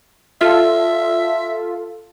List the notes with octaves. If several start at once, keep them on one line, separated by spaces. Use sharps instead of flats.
F4 A4 E5